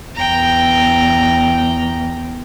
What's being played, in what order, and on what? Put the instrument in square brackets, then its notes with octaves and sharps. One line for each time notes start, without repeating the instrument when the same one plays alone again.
[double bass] E2 [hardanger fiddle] G5 A#5